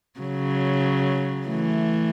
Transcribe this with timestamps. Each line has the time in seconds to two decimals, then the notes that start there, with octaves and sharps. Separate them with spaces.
0.20 C#3 F#3
1.47 E3 A3